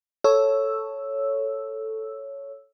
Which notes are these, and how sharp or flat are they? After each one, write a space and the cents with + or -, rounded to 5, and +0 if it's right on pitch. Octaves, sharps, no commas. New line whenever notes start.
A4 +0 C#5 +0 E6 +0